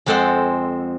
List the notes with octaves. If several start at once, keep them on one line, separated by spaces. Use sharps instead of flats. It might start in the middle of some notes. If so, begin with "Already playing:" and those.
F2 G#3 C4 A4 C5 F#5